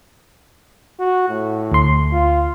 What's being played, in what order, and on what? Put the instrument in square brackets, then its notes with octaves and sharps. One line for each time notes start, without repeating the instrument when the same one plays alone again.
[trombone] F#4
A2
[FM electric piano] D2 C6
[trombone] F4